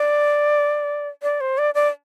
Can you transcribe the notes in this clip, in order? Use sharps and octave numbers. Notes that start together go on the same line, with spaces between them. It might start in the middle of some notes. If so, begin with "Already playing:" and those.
Already playing: D5
D5
C5
D5
D5